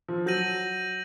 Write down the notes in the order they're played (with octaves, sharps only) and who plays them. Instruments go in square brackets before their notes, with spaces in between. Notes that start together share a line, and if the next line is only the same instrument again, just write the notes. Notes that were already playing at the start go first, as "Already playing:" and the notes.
[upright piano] F3
[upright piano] F#3 [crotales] G6 A#6 D#7 F#7